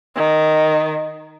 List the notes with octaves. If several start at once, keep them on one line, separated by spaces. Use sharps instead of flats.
D#3